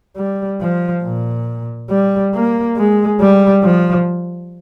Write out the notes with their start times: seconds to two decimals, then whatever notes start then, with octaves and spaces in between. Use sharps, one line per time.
0.16 G3
0.61 F3
1.04 A#2
1.89 G3
2.34 A#3
2.77 G#3
3.20 G3
3.63 F3